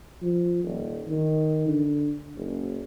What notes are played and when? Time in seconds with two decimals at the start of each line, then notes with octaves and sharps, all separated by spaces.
0.22 F3
0.64 D#1
1.08 D#3
1.68 D3
2.36 F#1